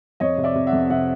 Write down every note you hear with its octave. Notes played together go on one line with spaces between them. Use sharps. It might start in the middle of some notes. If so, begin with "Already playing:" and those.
F2 C#5 D#5
C3
D5 E5
C3
E5 F#5
F2
C3 E5 F#5